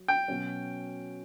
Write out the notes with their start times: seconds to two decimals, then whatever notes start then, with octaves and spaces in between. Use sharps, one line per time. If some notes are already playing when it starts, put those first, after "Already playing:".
Already playing: F#3
0.08 G5
0.28 B2 F#3 C#4